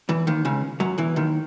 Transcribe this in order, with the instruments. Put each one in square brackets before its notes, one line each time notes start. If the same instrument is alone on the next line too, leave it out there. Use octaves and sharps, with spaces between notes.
[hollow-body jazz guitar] E2 E3
D#2 D#3
C#2 C#3
F#2 F#3
E2 E3
D#2 D#3